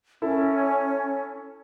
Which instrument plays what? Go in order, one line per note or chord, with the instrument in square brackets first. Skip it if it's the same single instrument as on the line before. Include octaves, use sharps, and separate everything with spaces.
[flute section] C#4 [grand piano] E4 A4